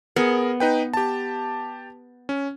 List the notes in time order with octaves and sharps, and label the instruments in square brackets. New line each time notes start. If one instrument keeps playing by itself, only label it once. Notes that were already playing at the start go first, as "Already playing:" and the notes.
[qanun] B3 [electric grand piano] G#4 A#4
[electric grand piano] D#4 B4 G5
G4 A5
C#4